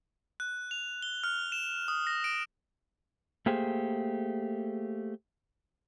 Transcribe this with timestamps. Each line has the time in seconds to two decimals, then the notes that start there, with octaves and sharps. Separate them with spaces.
0.40 F#6
0.71 F7
1.02 G7
1.24 F6
1.52 E7
1.88 D#6
2.07 A#6
2.24 D7
3.46 A3 A#3 G4 G#4 C5